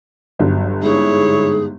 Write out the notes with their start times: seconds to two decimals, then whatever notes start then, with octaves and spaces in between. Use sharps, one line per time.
0.39 G1 G2 D3 F#3
0.83 G#2 E4 G#4 C#5